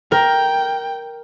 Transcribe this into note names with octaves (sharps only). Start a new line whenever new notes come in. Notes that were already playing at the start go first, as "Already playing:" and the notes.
A#4 G5